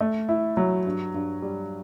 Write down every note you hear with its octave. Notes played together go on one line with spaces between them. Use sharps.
A3
E4
F#3
G2
G2
G3